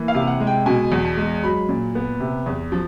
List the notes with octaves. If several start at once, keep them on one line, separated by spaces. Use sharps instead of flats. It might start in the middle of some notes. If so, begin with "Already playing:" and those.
Already playing: E3 A#3
F5
C3
F#5
G#3
G5
B2 G#5
E2
A5
G#3
F#3 B5
A#2
B3
C3
E2
F3